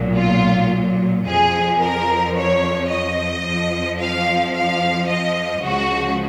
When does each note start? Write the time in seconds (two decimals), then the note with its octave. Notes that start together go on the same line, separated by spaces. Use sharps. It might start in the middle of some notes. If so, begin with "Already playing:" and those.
Already playing: B1 A#2 F#3
0.16 F4
1.26 F2 F3 G#4
1.80 A#4
2.36 C#5
2.90 D#5
3.45 F2 F3
3.99 F5
4.55 F5
5.09 D#5
5.63 C#2 C#3 F3 F#4